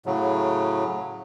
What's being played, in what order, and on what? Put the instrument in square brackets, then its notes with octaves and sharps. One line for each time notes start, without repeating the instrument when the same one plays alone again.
[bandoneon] A2 C#3 F#3